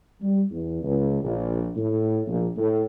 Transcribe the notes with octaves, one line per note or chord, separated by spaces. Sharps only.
G3
E2
C#2
A#1
A2
A#1
A2